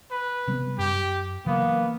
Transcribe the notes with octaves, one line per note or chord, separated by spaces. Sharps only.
B4
C3 G3 B3
F#2 G4
C#3 E3 F#3 A#3 B3